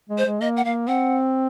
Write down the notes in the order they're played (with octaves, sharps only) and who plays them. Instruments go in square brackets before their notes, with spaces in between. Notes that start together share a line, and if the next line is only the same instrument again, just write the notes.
[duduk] G#3
[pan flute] C5
[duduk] G#3
[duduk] A#3 [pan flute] D#5
[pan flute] F#5
[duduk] A#3 [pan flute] F5
[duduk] C4 [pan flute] F#5